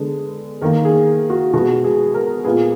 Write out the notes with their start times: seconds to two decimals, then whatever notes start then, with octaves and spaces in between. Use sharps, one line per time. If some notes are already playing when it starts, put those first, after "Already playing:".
Already playing: D3 G#3 B3
0.61 D#3 A#3 A#4
0.85 G#4
1.30 F#4
1.53 B2 G#3 B3 F#4
1.84 G#4
2.14 A#4
2.45 A#2 G#3 B3 G#4